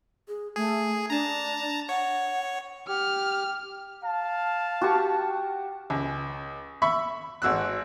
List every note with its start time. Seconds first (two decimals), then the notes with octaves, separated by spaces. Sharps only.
0.28 G#4
0.56 A3 G#4
1.10 D4 A5 A#5
1.89 C#5 F#5
2.88 G4 F6
4.03 F5 A5
4.82 F#4 G4 C#6
5.90 C#2
6.82 E5 B5 C#6
7.42 G#1 F#4 E6 F#6